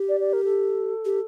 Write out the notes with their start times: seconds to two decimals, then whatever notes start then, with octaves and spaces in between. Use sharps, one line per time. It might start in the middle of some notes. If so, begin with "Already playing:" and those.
Already playing: G4
0.09 D5
0.20 D5
0.33 A#4
0.44 A4
1.05 G4